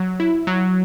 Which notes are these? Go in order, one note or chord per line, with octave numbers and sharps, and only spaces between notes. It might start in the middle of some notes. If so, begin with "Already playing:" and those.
Already playing: F#3
E4
F#3